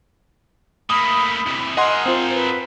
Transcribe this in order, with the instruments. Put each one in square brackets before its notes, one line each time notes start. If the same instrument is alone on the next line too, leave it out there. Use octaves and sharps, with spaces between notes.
[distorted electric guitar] A3 A#3 [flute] B5 [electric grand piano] D#6
[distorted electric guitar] C3 E3
[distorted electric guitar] G#4 A#4 [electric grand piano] D#5 F#5 C6
[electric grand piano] C4 F4 [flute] C5
[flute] B4